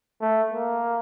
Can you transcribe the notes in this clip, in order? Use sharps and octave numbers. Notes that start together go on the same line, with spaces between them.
A3
A#3